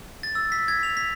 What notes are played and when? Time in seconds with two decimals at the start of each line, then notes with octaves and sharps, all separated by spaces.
0.23 A6
0.35 E6
0.52 B6
0.68 G#6
0.83 F7
0.97 B6